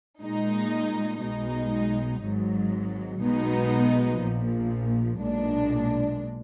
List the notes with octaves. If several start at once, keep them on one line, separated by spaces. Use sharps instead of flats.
A#2 G#3 D#4
B1 B2 G#3 D#4
G#1 G#2 F#3
B1 B2 G#3 B3 D#4
A#1 A#2 F3
B1 A#2 G#3 D4